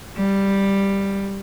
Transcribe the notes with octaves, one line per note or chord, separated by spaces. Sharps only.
G3